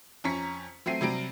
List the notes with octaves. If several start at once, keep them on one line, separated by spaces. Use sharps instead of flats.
F2 C#4 A#5 C#6 B6 C#7
F#3 A3 C4 G5 C7 D#7
C3 F#3 G3 D7